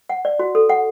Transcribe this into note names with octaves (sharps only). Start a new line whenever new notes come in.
F#5
D5
F#4
A4
F#5